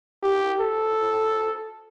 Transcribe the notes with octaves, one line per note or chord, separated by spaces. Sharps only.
G4
A4